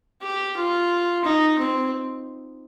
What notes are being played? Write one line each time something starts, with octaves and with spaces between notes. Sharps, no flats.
G4
F4
D#4
C4